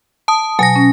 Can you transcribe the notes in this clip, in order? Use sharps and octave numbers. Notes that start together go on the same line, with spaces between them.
A5 D#6
B2 F#3 G#5 A#6
C#4